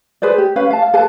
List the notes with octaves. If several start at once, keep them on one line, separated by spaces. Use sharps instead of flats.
G#4 B4 C5 D5
G4
C#4 B4 F5
F5 A5
F5
A4 B4 A5